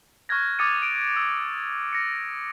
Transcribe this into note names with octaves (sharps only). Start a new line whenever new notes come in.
C#6 F6 F#6 G#6 A#6
D6 D#6 G#6 A6 C#7 D#7
D7
E6
A#6 C#7